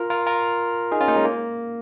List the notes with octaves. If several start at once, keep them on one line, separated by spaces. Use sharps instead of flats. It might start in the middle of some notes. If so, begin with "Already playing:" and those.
Already playing: F4 A#4
F4 A#4
F4 A#4
D#4 G#4
C#4 F4
A#3 D#4
G#3 C#4
A#3